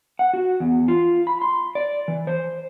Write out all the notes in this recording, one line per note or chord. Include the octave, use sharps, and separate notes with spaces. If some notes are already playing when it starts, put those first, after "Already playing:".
F#5
F#4
E2
F4
B5
C6
D5
E3
C5